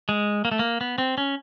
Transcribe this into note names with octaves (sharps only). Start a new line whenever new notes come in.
G#3
A#3
A3
A#3
B3
C4
C#4